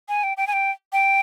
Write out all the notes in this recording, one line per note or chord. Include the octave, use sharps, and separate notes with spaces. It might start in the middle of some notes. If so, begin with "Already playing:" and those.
G#5
G5
G5
G#5
G5
G5